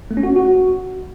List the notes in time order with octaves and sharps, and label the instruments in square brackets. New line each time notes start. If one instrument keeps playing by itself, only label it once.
[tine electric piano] A3
C#4
F#4
C#4
F#4